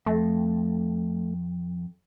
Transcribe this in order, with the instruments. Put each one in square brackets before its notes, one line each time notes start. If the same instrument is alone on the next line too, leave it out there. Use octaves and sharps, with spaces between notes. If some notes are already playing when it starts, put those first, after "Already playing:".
[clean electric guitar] F2 [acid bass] A3